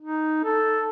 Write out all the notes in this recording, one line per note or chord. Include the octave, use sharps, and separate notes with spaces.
D#4
A4